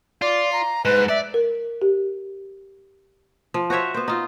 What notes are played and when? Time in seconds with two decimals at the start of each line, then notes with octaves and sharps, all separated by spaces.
0.22 F4 D5
0.53 A#5
0.85 G#2 B4
1.09 D5 E5
1.34 A#4
1.82 G4
3.54 F3
3.70 F#4 C5 C#5 E5
3.94 B3 C5
4.08 D#4 F4